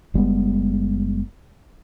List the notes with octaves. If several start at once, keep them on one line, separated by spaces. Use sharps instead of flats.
F#1 G3 G#3 B3